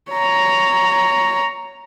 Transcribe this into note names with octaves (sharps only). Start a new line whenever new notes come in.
C#5 A#5